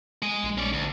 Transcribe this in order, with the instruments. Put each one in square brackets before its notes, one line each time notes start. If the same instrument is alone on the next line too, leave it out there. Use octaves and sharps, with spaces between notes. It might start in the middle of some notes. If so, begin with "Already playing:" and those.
[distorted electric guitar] G#3 D#5
[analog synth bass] A#1
[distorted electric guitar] C#4 D5
D2